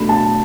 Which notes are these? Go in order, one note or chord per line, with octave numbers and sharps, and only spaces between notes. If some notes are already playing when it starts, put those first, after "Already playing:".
Already playing: B2 A3 D4 B5
A5